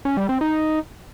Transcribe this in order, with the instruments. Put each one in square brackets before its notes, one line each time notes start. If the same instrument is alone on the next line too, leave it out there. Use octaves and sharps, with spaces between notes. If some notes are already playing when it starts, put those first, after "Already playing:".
[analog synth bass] C#4
G3
C4
D#4